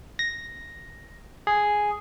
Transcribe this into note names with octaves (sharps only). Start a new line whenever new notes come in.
A#6
G#4